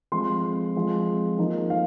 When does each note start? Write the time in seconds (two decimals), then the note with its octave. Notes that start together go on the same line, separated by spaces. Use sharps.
0.12 F3 G#3 C4 C6
0.75 F3 G#3 C4
1.39 F3 A#3 D#4
1.70 F5